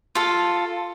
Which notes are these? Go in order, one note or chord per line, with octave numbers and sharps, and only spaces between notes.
F4 A4